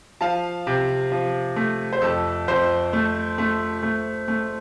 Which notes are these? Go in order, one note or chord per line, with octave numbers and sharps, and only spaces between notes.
F3 F5 A5
C3
F3
A3
C5
F2 A4
F2 C5
A3
A3
A3
A3